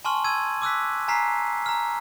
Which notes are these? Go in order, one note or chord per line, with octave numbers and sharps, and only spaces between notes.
G#5 A5 C6 C#6 F6 F#7
E6 G#6 D#7
D6 E6 F#6 B6
G#5 A#5 F6 B6 C7
A#5 F6